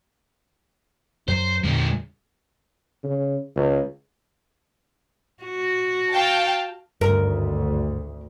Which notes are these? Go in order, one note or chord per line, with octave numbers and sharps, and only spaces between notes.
F#2 F#3 C5
E2 A#2 D3 G#3
C#3
C#2
F#4
F5 G5 A5
G#1 D2 G2 A#4